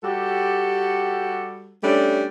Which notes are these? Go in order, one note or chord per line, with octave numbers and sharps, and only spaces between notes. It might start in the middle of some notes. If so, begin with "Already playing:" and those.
G3 F#4 G4 A4
G3 A3 C#4 D4